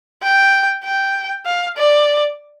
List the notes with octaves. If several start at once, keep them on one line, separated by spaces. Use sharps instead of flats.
G5
G5
F5
D5